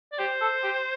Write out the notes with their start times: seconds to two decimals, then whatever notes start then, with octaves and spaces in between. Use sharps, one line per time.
0.12 D5
0.19 G4 C5
0.41 A4
0.64 G4